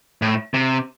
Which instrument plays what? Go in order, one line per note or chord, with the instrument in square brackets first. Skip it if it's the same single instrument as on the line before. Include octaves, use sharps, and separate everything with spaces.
[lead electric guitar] A2
C3